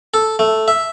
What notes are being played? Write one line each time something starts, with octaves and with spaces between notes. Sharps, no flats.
A4
A3
E5